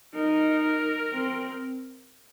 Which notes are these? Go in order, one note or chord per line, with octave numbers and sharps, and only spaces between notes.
D#4 A#4
C4